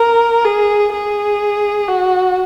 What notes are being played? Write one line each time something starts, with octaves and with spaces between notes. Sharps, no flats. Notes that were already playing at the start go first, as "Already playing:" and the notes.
Already playing: A#4
G#4
G#4
F#4